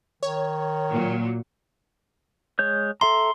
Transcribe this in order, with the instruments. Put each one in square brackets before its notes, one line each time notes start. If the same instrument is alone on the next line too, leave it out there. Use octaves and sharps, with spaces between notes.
[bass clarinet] D#3 [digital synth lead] C#5
[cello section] A#2 F#3
[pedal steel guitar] G#3 C#5 G6
[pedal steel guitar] A4 E5 A#5 [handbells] C6